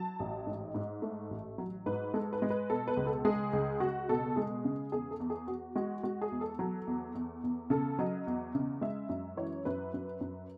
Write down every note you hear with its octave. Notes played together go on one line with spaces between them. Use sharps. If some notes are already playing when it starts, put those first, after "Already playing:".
Already playing: F#3 A5
A1
G#2 D#5
G#2
A3
A1
F#3
G#2 B4
G#3 A4
B4
G#3
B4
B2 A4
B4
C#2
A4
G#3 G#4
C#2
C#2 F#4
B2 A4
G#3 G#4
C#3
E2 G#4
A4
E2
G#4
E2 F#4
G#3 F#4
G#3 F#4
G#4
E2
A4
F#3
E2
E2
E2
C#3 A4
F#3 D#5
E2
C#3
G#3 E5
F#2
E3 C#5
F#2 B4
F#2
F#2